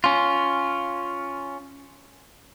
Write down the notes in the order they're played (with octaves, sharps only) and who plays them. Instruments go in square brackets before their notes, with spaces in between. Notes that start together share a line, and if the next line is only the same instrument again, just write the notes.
[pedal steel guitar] C#4 F4